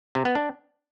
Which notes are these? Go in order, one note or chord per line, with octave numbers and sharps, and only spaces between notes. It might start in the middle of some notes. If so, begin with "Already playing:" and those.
C3
B3
D4